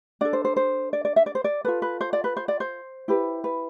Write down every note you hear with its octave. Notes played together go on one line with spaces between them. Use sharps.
D4 A4 D5
C5
C5
C5
D5
D5
E5
D5
C5
D5
F4 A4 B4
B4
C5
D5
B4
C5
D5
C5
E4 G4 B4
B4